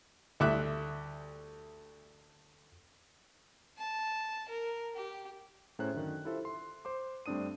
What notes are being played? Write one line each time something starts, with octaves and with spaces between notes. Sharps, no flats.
D2 G3 E5 D6 F#6
A5
A#4
G4
A2 C#4 G#4 C5 A#5 F#6
F#2 D3 D#3
E4 F4 G4 A4 C5 E5
C6
C5 C6 D6
G2 A3 C4 D4 D#6 D#7